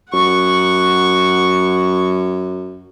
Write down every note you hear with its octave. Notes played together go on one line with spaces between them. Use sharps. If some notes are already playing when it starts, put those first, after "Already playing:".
F#2 F#5 C#6